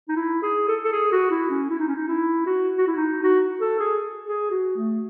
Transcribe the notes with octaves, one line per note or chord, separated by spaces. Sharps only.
D#4
E4
G#4
A4
A4
G#4
F#4
E4
C#4
E4
D#4
C#4
D#4
E4
F#4
F#4
E4
D#4
F#4
A4
G#4
G#4
F#4
A3